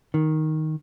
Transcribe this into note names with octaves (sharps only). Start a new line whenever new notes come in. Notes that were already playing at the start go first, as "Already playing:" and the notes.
D#3